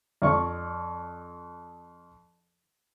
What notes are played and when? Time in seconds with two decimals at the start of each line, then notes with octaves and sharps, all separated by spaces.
0.22 F2 D5 C#6